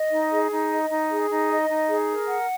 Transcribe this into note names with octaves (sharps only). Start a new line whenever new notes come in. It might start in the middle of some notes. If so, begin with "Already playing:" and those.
Already playing: D#5
D#4
G#4
D#4
D#5
D#4
G#4
D#4
D#5
D#4
G#4
A#4
F#5